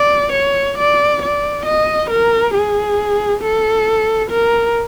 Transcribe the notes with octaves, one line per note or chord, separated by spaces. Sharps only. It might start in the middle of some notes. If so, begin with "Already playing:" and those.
Already playing: D5
C#5
D5
D5
D#5
A#4
G#4
A4
A#4